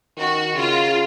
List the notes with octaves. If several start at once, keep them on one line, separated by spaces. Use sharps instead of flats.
D#3 F#4
C#3 F4